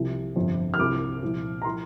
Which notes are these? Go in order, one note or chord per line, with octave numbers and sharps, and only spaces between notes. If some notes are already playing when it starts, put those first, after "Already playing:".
Already playing: C2 C3 F3
G1 F2 F3
F6
C2 C3 F3 D6
C2 A#2 F3
A#5
F3 C6